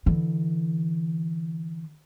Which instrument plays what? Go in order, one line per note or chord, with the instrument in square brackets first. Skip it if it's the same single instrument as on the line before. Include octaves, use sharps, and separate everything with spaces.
[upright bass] D3 E3